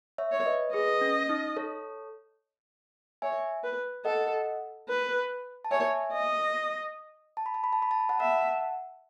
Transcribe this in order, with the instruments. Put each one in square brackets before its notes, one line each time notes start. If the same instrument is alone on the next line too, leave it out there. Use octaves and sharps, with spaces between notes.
[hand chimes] C#5 E5
[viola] C#5
[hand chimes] B4 D#5
[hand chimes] G#4 B4 [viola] D#5
[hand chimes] C#4
D#4
A4 C#5
[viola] C#5 [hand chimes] E5 G#5
[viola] B4
[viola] A4 [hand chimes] D#5 F#5
[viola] B4
[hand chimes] A5
[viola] C#5 [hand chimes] E5 G#5
[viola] D#5
[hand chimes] A5
B5
A5
B5
A5
B5
A5
B5
F#5 A5
[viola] E5 [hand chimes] F#5 A5